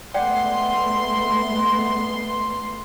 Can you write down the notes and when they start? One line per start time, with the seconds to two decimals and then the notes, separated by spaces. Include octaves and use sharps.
0.14 G#3 A3 B3 D5 F#5 G5 C6